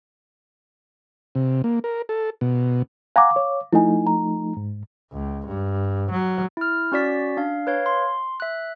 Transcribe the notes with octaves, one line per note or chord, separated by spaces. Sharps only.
C3
A#3
A#4
A4
B2
F5 F#5 G#5 A#5 D6
C#5
F3 A3 D#4 E4 G#5
A#5
G#2
C#2
G2
F#3
E4 F6
C#4 F#4 D5 B6
D4 F5
B4 C#5 F5
C6
E5 F#6